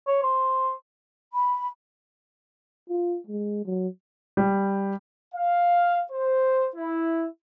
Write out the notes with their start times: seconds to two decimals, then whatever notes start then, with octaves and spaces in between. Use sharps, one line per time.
0.07 C#5
0.23 C5
1.33 B5
2.89 F4
3.27 G#3
3.66 F#3
4.37 G3
5.35 F5
6.12 C5
6.76 E4